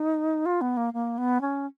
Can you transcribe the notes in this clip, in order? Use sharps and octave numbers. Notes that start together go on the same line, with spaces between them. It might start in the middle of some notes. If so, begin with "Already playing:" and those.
Already playing: D#4
F4
B3
A#3
A#3
B3
C#4